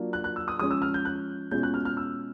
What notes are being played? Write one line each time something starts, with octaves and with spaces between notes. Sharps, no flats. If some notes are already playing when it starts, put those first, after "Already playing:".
Already playing: F#3 A#3 D4 F4
F#6
F#6
E6
D#6
F3 G#3 C#4 D#6
E6
F6
G6
F#6
B2 G#3 C#4 F4 G6
F#6
F6
F6
E6